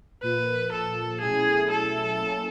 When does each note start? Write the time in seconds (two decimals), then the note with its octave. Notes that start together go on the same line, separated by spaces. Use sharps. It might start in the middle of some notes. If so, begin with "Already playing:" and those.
0.22 A#2 F3 A#3 B4
0.72 A4
1.21 B2 F#3 A3 C#4 E4 G#4
1.70 A4
2.19 F#3 A#3 C#4 E4